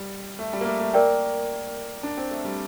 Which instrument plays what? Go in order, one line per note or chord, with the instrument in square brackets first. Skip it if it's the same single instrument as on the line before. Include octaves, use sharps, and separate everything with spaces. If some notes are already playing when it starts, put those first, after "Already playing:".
Already playing: [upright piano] G3
A3
G3
A#3
A3
A3
[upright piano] A#3 [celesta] A#4 D5 G5
[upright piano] D4
C4
A3
G3